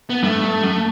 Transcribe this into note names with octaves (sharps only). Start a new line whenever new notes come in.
B3
G2 A3
G2
F#2